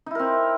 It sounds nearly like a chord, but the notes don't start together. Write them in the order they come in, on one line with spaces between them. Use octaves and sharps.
D#4 E4 A#4 C4